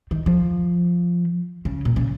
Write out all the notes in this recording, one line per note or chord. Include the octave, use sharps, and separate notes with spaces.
D#3
F3
C#3
A#2
C#3